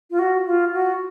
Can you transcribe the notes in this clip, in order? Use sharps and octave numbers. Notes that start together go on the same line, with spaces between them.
F4
F#4
F4
F#4